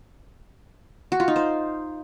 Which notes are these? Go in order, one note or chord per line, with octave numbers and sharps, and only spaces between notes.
F#4
F4
D#4
C5